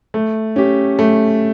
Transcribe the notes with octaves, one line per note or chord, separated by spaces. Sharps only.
A3
C#4 G4
A3